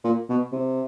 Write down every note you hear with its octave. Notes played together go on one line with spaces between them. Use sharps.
A#2
B2
C3